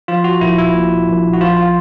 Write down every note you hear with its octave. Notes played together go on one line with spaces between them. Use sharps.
F3 F4
F#4
A#1 E4
E4
A#2
A#1
F#4
F3 F4
F4